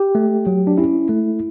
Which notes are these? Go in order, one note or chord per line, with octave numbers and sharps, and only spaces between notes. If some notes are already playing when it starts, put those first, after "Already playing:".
Already playing: G4
A3
F#3
D4
C#4 E4
A3